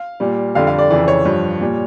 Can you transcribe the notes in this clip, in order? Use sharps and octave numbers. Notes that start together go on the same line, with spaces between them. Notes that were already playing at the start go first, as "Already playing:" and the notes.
Already playing: F5
A#2 G3
F2 D3 G3 F5
F5
D5
F2 C#3 E3 D5
C#5
G2 F3
A#2 G3